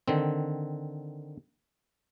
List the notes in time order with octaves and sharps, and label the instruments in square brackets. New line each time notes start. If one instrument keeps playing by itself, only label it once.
[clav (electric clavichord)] D3 D#3 C4